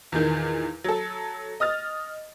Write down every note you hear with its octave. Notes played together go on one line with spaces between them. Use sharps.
E2 A#2 D#3 G6
F#3 A4
D#5 D#6 F6 A6